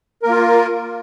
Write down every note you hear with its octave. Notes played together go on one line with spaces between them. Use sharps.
A#3 F4 A#4